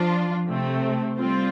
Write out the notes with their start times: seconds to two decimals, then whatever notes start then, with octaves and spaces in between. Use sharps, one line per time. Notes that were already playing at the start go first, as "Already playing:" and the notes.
Already playing: F3 D4 F4
0.47 C3 A3 C4
1.18 G3 C4 F4